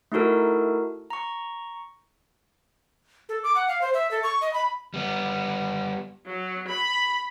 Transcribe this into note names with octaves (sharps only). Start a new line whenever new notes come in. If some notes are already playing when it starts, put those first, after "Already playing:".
A3 D#4 E4 F#4 A4 A#4
A#5 C#6
A4
D6
F#5
F5
C5
E5
A4
C#6
D#5
B5
G3 B3
F#3
B5